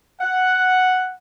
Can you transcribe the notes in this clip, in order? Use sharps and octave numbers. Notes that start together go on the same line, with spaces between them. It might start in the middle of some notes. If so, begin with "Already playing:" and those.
F#5